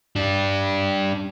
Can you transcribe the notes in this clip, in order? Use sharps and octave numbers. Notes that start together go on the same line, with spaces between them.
D4 G4